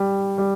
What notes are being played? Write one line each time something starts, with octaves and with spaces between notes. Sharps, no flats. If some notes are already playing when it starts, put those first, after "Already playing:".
Already playing: G3
G3